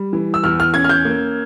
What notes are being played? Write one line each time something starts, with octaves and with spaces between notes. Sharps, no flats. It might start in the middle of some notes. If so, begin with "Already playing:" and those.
Already playing: G3
E3
E6
E2 F6
F6
C#4 G#6
F6
G6
A#3